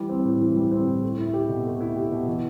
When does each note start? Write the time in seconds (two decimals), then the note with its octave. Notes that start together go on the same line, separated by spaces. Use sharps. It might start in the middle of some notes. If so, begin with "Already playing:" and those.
Already playing: E3 G3
0.09 C4
0.25 A2
0.41 E3
0.56 G3
0.71 C4
0.87 A2
1.02 A3
1.18 E4
1.34 G4
1.49 B2
1.65 A3
1.81 E4
1.95 G4
2.11 B2
2.27 E3